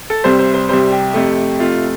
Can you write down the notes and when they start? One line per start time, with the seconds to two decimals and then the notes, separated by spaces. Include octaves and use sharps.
0.10 A4
0.24 C2 C3 G3 C5
0.39 C5
0.54 C5
0.69 C2 C3 G3 C5
0.92 G4
1.14 F2 C3 A3
1.59 F2 C3 A3 F4